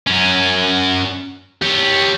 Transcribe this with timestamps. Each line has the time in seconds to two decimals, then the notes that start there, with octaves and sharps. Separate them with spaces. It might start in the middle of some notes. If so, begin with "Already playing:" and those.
0.07 F#2 C#4
1.62 G4 C#5